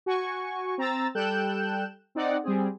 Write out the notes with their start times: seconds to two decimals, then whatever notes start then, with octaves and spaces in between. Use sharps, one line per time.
0.06 F#4 G#5 C#6
0.78 C4 A#5 E6 A6
1.15 G3 A4 G5 F#6 G6 E7
2.15 C4 D#4 D5 F#5
2.43 G3 C4 G#4